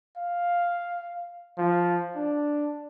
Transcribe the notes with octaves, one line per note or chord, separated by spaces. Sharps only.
F5
F3
D4